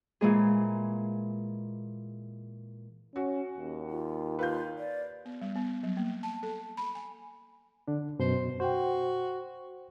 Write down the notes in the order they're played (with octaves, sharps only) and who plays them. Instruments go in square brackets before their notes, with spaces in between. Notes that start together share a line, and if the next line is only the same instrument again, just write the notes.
[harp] A#2 E3 G#3 G#4
[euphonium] C#4 [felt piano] F#4
[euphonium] D#2
[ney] F4
[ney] F4 [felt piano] B4 F5 G6
[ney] D5
[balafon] B3
G3
B3
F#3
A#3
A5
A4
B5
G#5
[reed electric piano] D3 D4
[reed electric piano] F#2 B2 [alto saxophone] C5
[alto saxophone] F#4 [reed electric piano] C5 G5